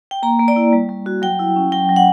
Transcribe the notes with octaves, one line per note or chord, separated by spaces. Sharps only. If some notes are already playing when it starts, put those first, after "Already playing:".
G5
A#3 A#5
A#3
D5
E4
G3
G3
F#4
F#3 G5
E4
C#4
F#3 G5
F#3
F#5